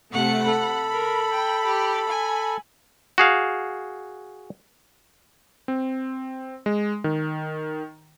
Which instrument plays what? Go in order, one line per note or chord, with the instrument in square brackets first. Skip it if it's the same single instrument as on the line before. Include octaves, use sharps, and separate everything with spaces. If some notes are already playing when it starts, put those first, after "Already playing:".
[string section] C3 A3 C#7 [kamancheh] F#5
[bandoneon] A4 [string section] B5
[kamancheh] A#4
G5
G4
G#5
[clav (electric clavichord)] F#4 G#4 F5
[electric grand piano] C4
G#3
D#3